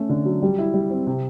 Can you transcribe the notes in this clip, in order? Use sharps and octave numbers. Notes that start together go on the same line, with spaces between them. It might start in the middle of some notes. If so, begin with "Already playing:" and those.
Already playing: A3 C#4
D3
F#3
G3
E4
G3
C4
C3